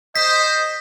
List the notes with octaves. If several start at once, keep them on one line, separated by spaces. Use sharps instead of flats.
C5 D#5 B6